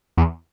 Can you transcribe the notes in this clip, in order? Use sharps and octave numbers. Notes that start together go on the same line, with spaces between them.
E2